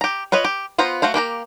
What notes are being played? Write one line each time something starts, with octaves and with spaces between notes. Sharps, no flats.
G4 A#5
F4 B4 C#5 D#5
G4
B3 F4 B4 C5 A#5
A3 F#4 C5 F5
A#3 G4 B4 A#5